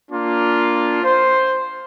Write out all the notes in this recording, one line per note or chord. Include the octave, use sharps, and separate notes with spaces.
A#3 D4 F4
C5